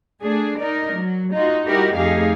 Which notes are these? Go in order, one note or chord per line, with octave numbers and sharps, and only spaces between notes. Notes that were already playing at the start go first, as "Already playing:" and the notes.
A3 D4 G#4
D#4 A#4 D5
F#3
D#4 F4 F#4
G3 D#4 E4 F#4 G4 A#4
F2 A3 D#4 G4 G#4 F5